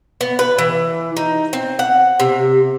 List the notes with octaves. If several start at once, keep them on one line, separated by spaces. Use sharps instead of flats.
B3
B4
E3
D#4
C4
F#5
C3